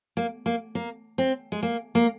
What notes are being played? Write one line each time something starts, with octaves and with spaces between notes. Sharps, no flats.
A#3
A#3
A#3
C4
G#3
A#3
A#3